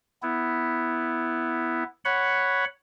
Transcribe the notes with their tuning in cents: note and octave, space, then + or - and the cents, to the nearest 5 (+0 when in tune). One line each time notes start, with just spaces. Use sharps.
B3 +0 E4 +0
C#5 +0 F#5 +0 B5 +0